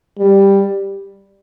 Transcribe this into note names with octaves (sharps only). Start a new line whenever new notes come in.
G3